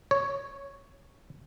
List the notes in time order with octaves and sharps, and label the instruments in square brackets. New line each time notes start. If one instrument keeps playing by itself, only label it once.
[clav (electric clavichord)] C#5